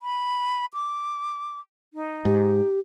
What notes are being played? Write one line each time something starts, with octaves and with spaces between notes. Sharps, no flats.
B5
D6
D#4
G#2 G4